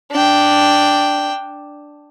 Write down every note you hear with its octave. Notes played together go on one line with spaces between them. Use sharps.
D4 G5